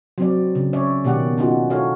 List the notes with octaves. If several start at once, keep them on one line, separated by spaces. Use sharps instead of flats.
F#3 C4 D5
C#3
C#4 C#5 D5 E5
B2 D#3 A#3 G4 D5 F#5
C#4 D#4 F4 F#4
E4 F#4 A4 C#5 F5